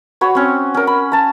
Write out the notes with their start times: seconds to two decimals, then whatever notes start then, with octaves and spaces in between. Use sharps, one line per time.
0.21 F#4 C#5 B5
0.35 C4 C#4
0.74 C#4 A#4
0.87 B5
1.12 A5 A#5